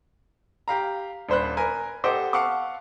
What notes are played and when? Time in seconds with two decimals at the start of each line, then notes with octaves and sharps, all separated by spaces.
0.68 G4 F5 A#5
1.29 D#1 D4 C5 B5 F#6
1.57 A#4 B4 G#5
2.04 G4 A4 C5 D#5 F#5 D6
2.33 F5 F#5 A5 C#6 D6